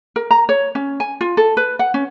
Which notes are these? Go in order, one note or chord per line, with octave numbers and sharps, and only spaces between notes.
A#4
A#5
C#5
C#4
G#5
F4
A4
B4
F#5
C#4